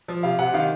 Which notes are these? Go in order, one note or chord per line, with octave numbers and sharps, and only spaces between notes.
F3
C3 F5
C3 F#5
D#3 F5